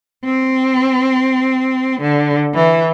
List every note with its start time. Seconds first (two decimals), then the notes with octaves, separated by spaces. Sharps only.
0.25 C4
2.01 D3
2.54 E3